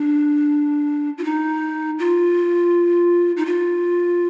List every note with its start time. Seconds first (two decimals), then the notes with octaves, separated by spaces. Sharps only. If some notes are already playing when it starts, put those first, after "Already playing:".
Already playing: D4
1.18 F4
1.24 D#4
1.99 F4
3.37 D#4
3.46 F4